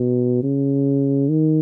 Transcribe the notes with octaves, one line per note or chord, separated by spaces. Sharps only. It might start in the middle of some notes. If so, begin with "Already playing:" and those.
Already playing: B2
C#3
D#3